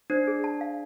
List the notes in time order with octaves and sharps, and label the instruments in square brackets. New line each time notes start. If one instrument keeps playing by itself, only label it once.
[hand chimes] D4 [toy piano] C5
[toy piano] G#4
A5
F5